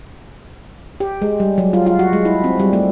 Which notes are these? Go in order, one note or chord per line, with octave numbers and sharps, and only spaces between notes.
G4
G#3
G3
F#3
F4
F4
F#4
G#3
E4
C4
G3
A3